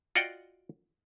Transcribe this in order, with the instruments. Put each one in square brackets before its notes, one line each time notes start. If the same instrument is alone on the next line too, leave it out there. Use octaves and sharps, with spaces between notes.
[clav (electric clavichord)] F4 F#4 D5 D#5 F#5 G5